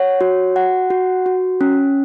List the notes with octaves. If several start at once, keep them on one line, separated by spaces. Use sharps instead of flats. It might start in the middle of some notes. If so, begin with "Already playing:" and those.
Already playing: C#5 F#5
F#4
F#5
F#4
F#4
C#4